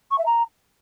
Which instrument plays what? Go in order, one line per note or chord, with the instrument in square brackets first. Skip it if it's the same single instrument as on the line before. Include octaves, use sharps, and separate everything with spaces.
[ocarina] C#6
E5
A#5